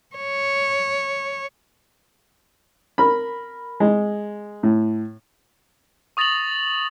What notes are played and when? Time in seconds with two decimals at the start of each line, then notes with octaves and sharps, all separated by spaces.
0.16 C#5
2.98 A#4 B5
3.80 G#3
4.63 A2
6.17 C#6 D#6 A6 A#6 F7 F#7